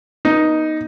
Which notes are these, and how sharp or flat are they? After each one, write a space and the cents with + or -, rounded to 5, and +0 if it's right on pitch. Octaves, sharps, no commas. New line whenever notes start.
B3 -40 D#4 +0